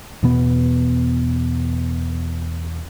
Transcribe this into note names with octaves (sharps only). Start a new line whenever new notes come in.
E2 B2 B3